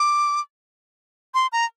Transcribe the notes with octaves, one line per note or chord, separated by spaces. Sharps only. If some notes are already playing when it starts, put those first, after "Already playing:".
Already playing: D6
C6
A#5